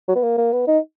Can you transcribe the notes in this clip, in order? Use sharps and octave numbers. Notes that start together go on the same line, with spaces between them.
F#3
B3
A#3
A#3
B3
D#4